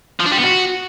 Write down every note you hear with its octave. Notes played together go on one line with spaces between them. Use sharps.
F3
D4
G3
B3
F#4